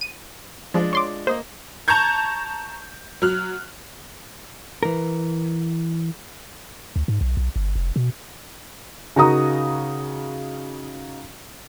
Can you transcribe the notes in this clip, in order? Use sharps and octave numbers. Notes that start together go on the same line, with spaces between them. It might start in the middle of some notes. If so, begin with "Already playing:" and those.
D#7
F3 G#3 D4 F4
C#5 C6 D6
A#3 C5 D#5
A5 A#5 C#6 G6 G#6
F#3 F6 F#6
E3 A#4
D2
G#2
B1
B1
G1
F1
B2
C#3 D#4 F#4 A#4 A#5 D#6